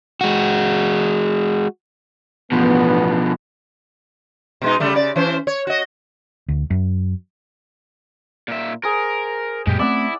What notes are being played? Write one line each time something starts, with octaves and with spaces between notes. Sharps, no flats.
G#3 F#4
A1 G2 B2 F3 B3
B2 G#3 D#4
C#3 G3 A3
C#3 D5
E3 C#4 C5
C#5
F#4 D#5
D2
F#2
A#2 E5
G#4 A#4 C5
F#2 A#2 G#3 G4
A3 C4 C#4 E4 D5 F#5 E6